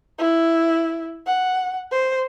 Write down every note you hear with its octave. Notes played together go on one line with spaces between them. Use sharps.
E4
F#5
C5